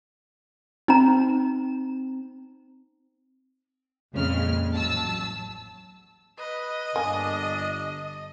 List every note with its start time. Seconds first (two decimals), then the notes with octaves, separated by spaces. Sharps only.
0.88 C4 D#4 A#5
4.13 F2 A#2 C#3 G#3 F6
4.73 A1 D#2 F#3 A5 E6
6.39 B4 D#5
6.96 G1 A#3 D4 G#5